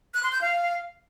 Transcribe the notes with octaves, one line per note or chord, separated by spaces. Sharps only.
F#6
C6
G6
F5